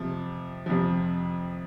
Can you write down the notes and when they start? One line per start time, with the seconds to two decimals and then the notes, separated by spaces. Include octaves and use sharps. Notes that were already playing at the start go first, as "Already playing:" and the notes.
Already playing: F2 C3 F3
0.66 F2 C3 F3